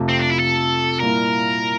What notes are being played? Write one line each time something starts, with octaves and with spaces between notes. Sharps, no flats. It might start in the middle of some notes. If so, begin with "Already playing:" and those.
Already playing: F2 C3 F3 A3
C4
D4
E4
A4
A#2 G3 A#3 E4 A#4